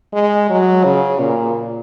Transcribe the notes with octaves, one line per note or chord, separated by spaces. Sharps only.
G#3
F#3
C#3
A#2